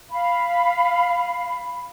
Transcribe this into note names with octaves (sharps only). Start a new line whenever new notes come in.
F5 B5